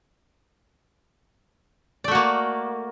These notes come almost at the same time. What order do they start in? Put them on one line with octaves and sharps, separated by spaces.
D5 A3 F#4 A#3